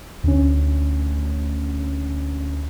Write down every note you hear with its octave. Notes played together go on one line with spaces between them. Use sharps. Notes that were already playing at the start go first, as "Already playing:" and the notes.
D2 C#4